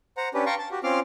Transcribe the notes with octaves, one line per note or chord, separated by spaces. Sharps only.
C5 F#5 A#5
C#4 D4 G4 B4
F5 G5 A5 A#5 C6 C#6
A5
F#4 G4
C4 C#4 F4 C6 D6 F6